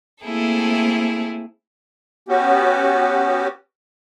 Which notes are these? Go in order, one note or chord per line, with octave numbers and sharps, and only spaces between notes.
A3 A#3 C4 E4 G#4 A4
B3 C#4 F#4 G4